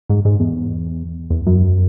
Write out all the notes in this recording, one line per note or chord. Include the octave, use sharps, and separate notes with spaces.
G#2
G#2
E2
E2
F#2